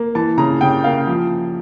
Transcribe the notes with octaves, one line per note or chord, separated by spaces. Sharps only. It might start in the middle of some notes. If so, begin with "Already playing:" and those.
Already playing: A#3
E3 A5
C#3 A#5
C#3 G5
A#3 F5
F3